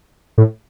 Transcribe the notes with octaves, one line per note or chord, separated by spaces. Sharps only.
A2